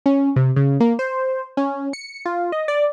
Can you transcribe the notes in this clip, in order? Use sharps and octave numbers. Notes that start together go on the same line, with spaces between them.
C#4
C3
C#3
A#3
C5
C#4
C#7
F4
D#5
D5